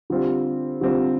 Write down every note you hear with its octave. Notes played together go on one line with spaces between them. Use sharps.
D3 G3 C4 F4
D3 G3 C4 F4